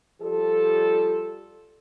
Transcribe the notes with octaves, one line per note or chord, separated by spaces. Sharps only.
F3 G3 G4 A4